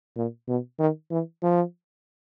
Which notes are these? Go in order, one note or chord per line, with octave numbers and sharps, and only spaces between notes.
A#2
B2
D#3
E3
F3